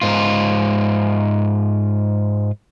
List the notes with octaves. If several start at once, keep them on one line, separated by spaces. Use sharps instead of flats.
G#2 F4